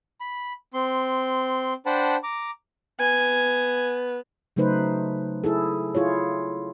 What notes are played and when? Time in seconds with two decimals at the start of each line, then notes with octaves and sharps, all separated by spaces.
0.21 B5
0.74 C4 C6
1.86 D4 C5 F#5 G5 A5 B5
2.23 A#5 D6
3.00 B3 G#5
4.56 C#3 F#3 A3 D#4 B4 C5
5.44 E4 G#4 A4
5.95 E4 F4 G#4 C#5